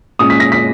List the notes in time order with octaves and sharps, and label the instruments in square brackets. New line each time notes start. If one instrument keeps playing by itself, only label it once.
[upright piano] A#2 G#3 C#4 D#6
B6
A#6
B6